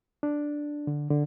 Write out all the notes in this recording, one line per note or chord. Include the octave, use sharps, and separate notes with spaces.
D4
D3
D3